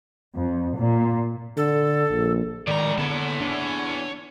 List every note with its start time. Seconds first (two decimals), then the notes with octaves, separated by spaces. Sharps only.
0.34 F2
0.78 A#2
1.57 D3 A4
2.11 A#1
2.67 A2 D#3 G#3 D5 A#5
2.98 E2 D3 B3 C#5 A5
3.41 E2 D4